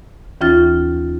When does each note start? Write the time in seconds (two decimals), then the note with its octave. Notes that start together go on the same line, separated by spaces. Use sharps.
0.41 D#2 E3 C#4 F4 F6 A6